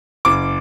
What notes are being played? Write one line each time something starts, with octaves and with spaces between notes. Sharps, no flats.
F#1 D6